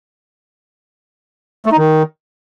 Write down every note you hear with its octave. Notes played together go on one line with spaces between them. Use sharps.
A3
D#4
D#3